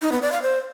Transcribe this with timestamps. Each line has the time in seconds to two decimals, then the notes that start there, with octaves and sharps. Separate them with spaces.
0.02 D#4
0.12 B3
0.22 D5
0.32 F5
0.42 C5